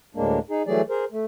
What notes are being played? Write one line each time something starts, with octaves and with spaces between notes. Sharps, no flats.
D2 A2 G#3 A#3 D4
D#4 G#4
E3 F#3 G3 A3 G#4 D5
G#4 A#4 C5
A3